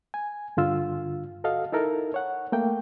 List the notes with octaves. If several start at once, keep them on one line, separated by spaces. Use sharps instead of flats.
G#5
G2 D3 F4 E6
F#4 A4 D#5 F5
D#4 E4 A4 A#4
C#5 F#5
A3 A#3 G5